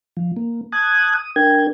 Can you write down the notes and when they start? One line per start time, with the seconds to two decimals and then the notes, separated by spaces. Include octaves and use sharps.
0.17 F3
0.36 A#3
0.72 A5 D#6 F#6 G#6
1.15 D#6
1.36 D4 A#4 G5 G#6